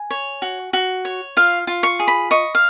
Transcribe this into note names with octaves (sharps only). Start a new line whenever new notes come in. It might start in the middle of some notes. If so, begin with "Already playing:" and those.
Already playing: G#5
C#5
F#4
F#4
C#5
F4 F5
F4
C#6
G#4
B5
D#5 C#6
F5